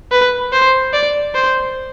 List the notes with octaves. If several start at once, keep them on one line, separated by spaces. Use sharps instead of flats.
B4
C5
D5
C5